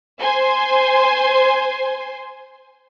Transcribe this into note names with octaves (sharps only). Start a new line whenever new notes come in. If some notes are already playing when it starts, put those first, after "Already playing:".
C5 G#5 C6